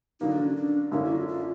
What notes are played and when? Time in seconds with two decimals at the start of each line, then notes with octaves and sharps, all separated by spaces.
0.20 D3 F#3 A#3 D#4
0.32 D4
0.45 C#4
0.57 D4
0.92 F#2 D3 F#3 A#3 C#4 D#4
1.04 E4
1.16 F4
1.28 F4